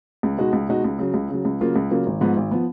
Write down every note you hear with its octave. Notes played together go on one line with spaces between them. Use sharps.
C#2
B2 G#3 D#4 F#4
C#2
B2 G#3 D#4 F#4
C#2
C#3 F#3
C#2
C#3 F#3
C#2
C#3 F#3 A#3 F4
C#2
C#3 F#3 A#3 F4
G#1
G#2 F3 B3
G#1
F3 B3